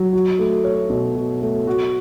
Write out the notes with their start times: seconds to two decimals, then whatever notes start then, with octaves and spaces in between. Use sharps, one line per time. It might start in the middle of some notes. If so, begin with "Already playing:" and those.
Already playing: F#3
0.13 F#4
0.39 A3
0.64 C#5
0.90 B2
1.15 F#4
1.41 A3
1.67 F#4